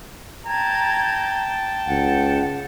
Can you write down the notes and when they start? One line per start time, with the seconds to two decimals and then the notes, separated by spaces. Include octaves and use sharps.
0.46 G5 A5 A#5 G#6
1.87 C#2 F#5